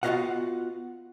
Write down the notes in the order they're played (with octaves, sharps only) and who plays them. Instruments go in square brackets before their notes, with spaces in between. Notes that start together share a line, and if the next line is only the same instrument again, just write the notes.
[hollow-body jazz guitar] B3 F4 F#4 D#5 F5 F#5